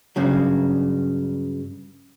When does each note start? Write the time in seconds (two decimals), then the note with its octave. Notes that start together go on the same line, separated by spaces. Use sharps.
0.16 G2 C#3 F#3